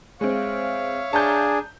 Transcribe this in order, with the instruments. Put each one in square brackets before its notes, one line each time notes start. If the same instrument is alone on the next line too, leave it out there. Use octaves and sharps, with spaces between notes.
[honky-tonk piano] G#3 C4 [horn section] C#5 E5 F5
[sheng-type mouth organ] D4 G#4 [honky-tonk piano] A5 A#5 G6